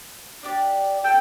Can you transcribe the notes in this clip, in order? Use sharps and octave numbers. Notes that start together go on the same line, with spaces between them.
D4 G4 D5
A4 G5